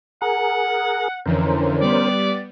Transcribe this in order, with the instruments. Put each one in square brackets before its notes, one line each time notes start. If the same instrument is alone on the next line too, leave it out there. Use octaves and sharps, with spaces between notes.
[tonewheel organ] G#4 A#4 [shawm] F#5
[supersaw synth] F2 D3 E3 [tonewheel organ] C#4 A#4 C5
[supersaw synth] G3 B3 [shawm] D5